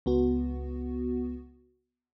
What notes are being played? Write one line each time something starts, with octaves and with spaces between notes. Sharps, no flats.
C#2 B3 F#4